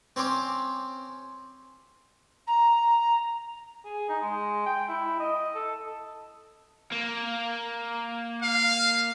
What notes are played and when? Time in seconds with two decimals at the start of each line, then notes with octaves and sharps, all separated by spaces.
0.16 C4 C#4 C6 D6
2.47 A#5
3.85 G#4
4.09 D#4
4.22 G#3
4.66 G5
4.89 E4
5.20 D#5
5.55 A4
6.92 A#3
8.42 F5